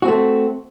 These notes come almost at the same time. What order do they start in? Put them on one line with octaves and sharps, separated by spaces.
F#4 C4 A3